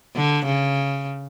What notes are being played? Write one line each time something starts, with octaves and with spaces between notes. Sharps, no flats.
D3
C#3